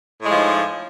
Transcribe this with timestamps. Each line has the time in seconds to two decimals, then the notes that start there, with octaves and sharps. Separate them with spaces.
0.21 A2
0.26 G#3
0.31 F3
0.35 D#4